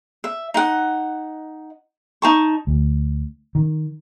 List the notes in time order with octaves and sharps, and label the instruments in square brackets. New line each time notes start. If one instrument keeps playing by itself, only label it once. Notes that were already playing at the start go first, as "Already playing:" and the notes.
[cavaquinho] E5
D#4 F#5
D#4 A5 C#6
[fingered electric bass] D2
D#3